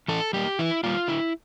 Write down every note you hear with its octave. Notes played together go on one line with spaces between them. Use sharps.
E3 A4
G3 A#3 G4
E3 E4
G3 A#3 F4
D3 E4